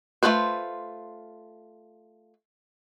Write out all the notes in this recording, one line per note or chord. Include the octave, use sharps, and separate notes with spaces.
A3 D#4 F4 B4 C5